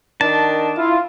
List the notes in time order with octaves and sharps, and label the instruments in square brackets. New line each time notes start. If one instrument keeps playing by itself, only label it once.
[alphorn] D#3 [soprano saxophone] D4 [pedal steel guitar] A5
[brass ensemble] E4 F4